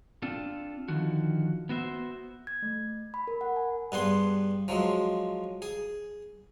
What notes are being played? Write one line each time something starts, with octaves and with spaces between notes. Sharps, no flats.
C4 D4 F4 A4
D3 D#3 F3 F#4
B3 F#4 C5 E5
G#6
A3
B5
A#4
F#5
G#5
G2 B3 G#4 C6
F3 F#3 G#3
G#4